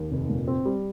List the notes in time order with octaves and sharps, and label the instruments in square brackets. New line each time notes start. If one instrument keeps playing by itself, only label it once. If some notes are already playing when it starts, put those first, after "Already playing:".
Already playing: [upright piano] D#2
F1
A#2
C4
G3